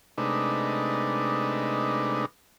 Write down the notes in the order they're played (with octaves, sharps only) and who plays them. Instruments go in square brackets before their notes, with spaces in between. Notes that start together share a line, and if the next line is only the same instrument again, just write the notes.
[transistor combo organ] C3 G#3 A3 D4 D#4 B4